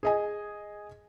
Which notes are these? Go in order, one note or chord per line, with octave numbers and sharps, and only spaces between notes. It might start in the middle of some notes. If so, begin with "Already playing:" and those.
G#4 D#5 G#5